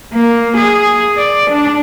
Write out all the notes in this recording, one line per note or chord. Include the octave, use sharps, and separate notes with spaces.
A#3
G#4
D5
D4